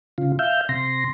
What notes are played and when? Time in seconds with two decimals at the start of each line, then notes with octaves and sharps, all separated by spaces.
0.18 C#3 F4
0.39 E5 F5 G6
0.69 C3 C6 A#6